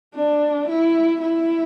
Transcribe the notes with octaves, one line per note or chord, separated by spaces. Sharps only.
D4
E4
E4